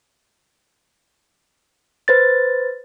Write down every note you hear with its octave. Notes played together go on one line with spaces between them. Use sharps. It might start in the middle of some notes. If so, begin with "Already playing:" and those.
B4 C5 A6